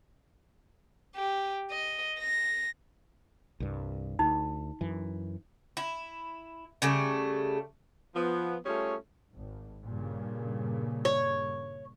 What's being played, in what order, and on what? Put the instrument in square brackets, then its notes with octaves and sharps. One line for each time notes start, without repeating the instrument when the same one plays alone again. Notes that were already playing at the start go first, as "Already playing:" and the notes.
[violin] G4
D#5
A#6
[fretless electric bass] C2 G2
[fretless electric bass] D2 [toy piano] D#4
[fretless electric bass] F#2 E3
[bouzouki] E4
C#3 G3 A3
[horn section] F3 B3
G3 A3 C#4 F4 G#4 C#5
[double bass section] G#1
G2 A#2 C#3
[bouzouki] C#5